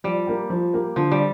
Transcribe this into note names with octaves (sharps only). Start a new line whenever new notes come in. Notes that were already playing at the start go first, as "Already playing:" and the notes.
F3 G3
A#3 G4
F3
A#3 G4
D3 F3
G3